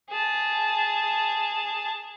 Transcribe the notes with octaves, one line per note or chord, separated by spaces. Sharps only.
G#4 A5